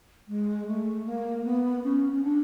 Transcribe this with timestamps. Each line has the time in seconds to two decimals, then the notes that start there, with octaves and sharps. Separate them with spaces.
0.28 G#3
0.67 A3
1.06 A#3
1.44 B3
1.84 C#4
2.12 C#4
2.23 D4